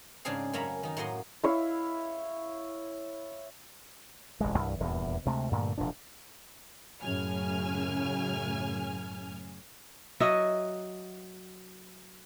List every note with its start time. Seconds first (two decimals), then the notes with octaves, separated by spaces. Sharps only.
0.25 G#2 C#3 C4 D4 G#4 F5
0.53 F#2 A#3 C#4 E5 A#5 B5
0.83 D#3 D#4
0.97 A2 F#3 A#3 D#5 C6
1.44 E4 C#5 F5 E6
4.41 E1 A1 G2 G#3
4.58 C2 G2 E3
4.80 D#1 E2 G2
5.26 D2 C3 G#3 A3
5.51 G2 A#2 D3 A3
5.78 E1 A#2 F3 D4
7.02 F#2 A2 C#3 G#5 F6
10.20 F#3 F#4 D#5 E5